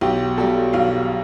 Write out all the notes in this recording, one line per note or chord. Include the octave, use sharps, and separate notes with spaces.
B1 G4
B2 G3 A4
B1 F5